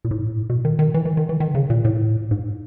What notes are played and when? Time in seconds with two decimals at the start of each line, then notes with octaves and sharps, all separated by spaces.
0.05 A#2
0.11 A2
0.19 G#2
0.26 A2
0.49 B2
0.65 D#3
0.79 D#3
0.94 E3
1.05 E3
1.17 D#3
1.29 E3
1.40 D#3
1.48 D3
1.55 C#3
1.70 A#2
1.85 A2
2.31 G#2